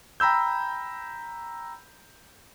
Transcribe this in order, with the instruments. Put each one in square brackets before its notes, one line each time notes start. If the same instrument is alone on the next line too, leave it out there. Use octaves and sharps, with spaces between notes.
[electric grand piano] G5 A#5 B5 E6 G6